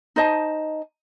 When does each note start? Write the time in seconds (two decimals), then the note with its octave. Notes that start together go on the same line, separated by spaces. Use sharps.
0.16 D#4 C5 D#5 A5